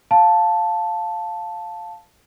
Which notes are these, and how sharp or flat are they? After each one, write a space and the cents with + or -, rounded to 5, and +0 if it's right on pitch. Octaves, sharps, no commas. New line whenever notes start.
F5 +5 A5 +0